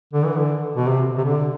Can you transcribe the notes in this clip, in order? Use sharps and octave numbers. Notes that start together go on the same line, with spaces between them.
D3
E3
D3
B2
C3
C3
D3